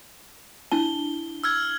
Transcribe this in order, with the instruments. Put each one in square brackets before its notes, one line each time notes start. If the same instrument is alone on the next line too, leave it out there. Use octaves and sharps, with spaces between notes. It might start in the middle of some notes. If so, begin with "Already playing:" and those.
[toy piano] D4 E4 A5 [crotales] G7
[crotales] E6 F6 G#6